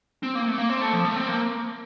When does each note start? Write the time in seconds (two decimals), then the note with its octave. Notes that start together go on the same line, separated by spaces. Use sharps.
0.23 C4
0.35 A#3
0.47 A3
0.58 A#3
0.69 C4
0.81 A3
0.93 F3
1.05 A3
1.16 C4
1.28 A#3